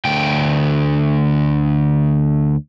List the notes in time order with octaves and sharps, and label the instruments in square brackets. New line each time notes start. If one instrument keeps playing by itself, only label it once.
[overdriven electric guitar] D2 G5